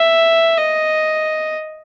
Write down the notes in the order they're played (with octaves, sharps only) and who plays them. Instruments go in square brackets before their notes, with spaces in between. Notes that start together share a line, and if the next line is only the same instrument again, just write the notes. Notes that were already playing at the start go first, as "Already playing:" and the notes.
Already playing: [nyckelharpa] E5
D#5